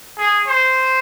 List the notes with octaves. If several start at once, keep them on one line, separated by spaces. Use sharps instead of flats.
G#4
C5